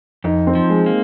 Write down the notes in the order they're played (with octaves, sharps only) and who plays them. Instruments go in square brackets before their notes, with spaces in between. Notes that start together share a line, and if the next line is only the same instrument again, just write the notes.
[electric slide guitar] F2 [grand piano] D#4
[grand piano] C4
[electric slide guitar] F3
[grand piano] G#3
[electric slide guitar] A#3